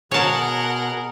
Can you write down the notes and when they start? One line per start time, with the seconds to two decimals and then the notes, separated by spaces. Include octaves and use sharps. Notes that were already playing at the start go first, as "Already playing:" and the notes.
0.11 B2 G#4 A#4 C#5 F#5 A5